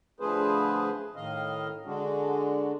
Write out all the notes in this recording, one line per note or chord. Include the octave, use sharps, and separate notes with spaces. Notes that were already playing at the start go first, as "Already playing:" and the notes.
D3 F3 A3 G#4 B4 C5
A2 D#3 D#5 F5
D3 G#3 D4 F#4